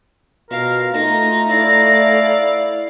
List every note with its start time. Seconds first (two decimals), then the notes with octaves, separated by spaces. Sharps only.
0.51 B2 F4 A#4 F5
0.93 A3 D#4 A#5
1.49 E4 D5 F5